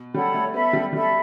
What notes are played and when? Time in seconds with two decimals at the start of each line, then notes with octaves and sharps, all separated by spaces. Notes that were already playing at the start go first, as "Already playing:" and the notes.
Already playing: B2
0.14 G3 A4 C#5 F#5 B5
0.34 A3
0.54 B3 A4 E5 B5
0.73 G3
0.93 G3 A4 E5 B5